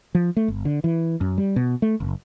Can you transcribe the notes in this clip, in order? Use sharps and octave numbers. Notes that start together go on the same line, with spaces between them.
F3
A3
G1
D3
E3
F#2
G3
B2
A3
F#1